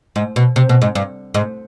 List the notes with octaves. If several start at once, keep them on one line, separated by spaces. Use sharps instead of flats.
G#2
B2
C3
B2
G#2
G2
G#2